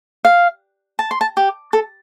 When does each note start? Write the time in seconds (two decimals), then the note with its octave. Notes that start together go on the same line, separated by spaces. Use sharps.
0.25 F5
0.99 A5
1.11 C6
1.21 A5
1.37 G4
1.73 A4